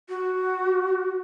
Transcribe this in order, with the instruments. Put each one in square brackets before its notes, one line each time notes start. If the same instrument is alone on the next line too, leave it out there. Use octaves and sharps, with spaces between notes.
[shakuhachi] F#4